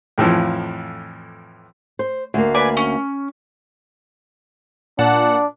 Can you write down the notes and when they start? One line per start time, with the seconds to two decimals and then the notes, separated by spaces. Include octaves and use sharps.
0.18 F2 A2 E3 F3
1.99 C5
2.34 D2 A#3
2.54 B4 D5 G#5
2.77 C#4
4.99 A#2 D4 F#5 A5